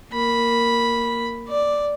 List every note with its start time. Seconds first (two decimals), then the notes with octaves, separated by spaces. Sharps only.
0.11 A#3 B5
1.49 D5